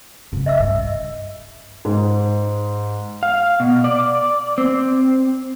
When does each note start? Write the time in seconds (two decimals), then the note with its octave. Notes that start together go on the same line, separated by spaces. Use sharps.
0.32 F#2 C#3
0.46 D#5 E5 E6
0.60 G2
1.85 G#2
3.23 F5
3.60 B2
3.84 D5
4.58 C4